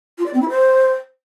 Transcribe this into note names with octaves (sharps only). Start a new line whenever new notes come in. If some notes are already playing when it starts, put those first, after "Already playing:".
F4
D5
C4
E4
C5